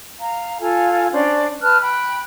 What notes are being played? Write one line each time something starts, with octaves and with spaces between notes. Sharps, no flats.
F5 A#5
F4 A4 F5 G#5
C#4 D4 C5 D5
B4 A5 F6 F#6
G5 B5 F#6